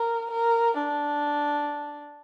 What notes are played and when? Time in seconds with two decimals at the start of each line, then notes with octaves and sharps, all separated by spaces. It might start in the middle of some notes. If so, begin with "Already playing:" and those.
Already playing: A#4
0.31 A#4
0.76 D4